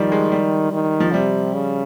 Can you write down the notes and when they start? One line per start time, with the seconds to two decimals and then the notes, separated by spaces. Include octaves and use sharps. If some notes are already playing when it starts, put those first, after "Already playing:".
Already playing: D#3 F3 G3
0.12 G#3
0.32 G3
0.73 D#3
1.00 F3
1.13 C3 G3
1.54 C#3